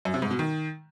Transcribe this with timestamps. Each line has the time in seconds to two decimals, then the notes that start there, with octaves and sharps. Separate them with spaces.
0.05 F#2
0.14 C3
0.22 G#2
0.31 B2
0.39 D#3